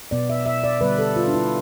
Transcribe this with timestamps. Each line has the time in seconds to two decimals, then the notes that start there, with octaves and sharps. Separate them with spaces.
0.11 B2 B3 D5
0.30 E5
0.46 E5
0.64 D5
0.81 D3 G3 B3 B4
0.98 A4
1.16 F4
1.28 D4
1.34 E4